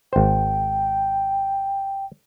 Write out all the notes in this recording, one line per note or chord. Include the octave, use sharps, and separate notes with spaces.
G#1 C5 G5